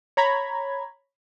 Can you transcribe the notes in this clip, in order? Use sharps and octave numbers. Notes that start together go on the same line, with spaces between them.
C#5 A#5 B5 G#6